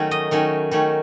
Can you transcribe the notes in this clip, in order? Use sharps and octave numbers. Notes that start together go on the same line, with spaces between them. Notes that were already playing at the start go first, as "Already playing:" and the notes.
Already playing: D#3 F#3 A3 C#4
D#5
D#3 F#3 A3 C#4
D#3 F#3 A3 C#4